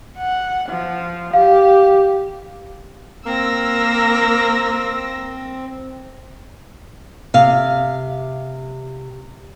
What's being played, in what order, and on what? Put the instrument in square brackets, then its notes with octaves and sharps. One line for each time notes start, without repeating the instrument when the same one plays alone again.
[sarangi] F#5
F3
[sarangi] G4 [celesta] F5
[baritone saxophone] A#3 [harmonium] C4 [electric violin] E6 A#6
[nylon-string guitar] C3 F5